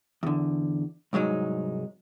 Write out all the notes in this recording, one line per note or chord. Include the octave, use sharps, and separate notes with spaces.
E2 D3
C2 G#2 F#3 G#3 D#4